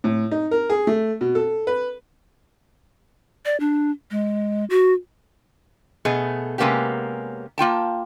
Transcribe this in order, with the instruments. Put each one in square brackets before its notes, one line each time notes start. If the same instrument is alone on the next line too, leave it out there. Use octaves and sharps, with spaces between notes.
[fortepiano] A2
D#4
A#4
G#4
A3
B2
A4
B4
[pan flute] D5
D4
G#3
F#4
[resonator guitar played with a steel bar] B2 A3 B3 G#4
C3 G#3 A#3 B3 C#4 G4
A#3 F4 G5 A5